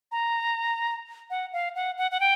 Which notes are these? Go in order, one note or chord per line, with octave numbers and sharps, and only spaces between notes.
A#5
F#5
F5
F#5
F#5
F#5
G5